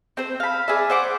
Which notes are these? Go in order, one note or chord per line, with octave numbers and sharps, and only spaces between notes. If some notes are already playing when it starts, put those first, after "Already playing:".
C4 C5
F5 B5
G#4 D5 E5
C5 F#5 D6